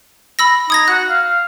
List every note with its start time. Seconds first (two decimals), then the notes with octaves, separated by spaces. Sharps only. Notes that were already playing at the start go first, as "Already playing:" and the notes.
0.39 B5 E6 A#6
0.70 D#4 D#6 G#6 A#6
0.88 F#4 F#6
1.10 F5